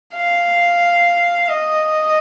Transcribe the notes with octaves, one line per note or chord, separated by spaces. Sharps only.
F5
D#5